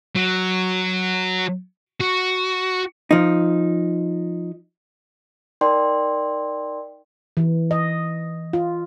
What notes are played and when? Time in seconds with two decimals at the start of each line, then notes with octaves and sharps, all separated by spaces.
0.15 F#3
2.01 F#4
3.11 F3 D#4
5.61 D#4 A#4 D5 G5 C6
7.37 E3
7.71 D#5
8.53 F4